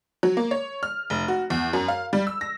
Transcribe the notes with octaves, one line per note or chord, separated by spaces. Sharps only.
F#3
A#3
C#5
F6
F1
F#4
E2
F#2
F5
G3
E6
A#6